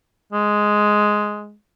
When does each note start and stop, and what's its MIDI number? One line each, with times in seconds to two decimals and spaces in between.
0.33 1.55 56